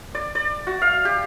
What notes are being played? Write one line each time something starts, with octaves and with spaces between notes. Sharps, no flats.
D5
D5
F#4
F5
G4